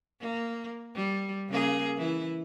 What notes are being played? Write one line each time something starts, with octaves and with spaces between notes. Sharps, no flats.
A#3
G3
C#3 A#3 G#4
E3 E4